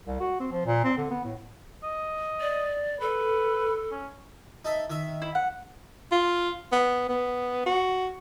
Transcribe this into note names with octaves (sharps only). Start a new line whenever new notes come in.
C2
F#4
C4
F3
A#2
C4
D3
B3
A2
D#5
D5
A4 B4
C#4
D#4 A4 E5
D#3 E5
E4
F#5
F4
B3
B3
F#4